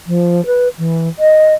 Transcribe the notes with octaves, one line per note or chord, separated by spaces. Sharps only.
F3
B4
E3
D#5